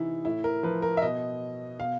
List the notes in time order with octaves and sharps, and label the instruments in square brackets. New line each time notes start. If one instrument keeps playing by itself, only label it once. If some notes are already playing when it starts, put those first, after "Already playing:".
Already playing: [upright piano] C3 E3 D#4 E4
A2 E4
A#4
F3 B4
A#4
E5
B2 D#5
B2 F5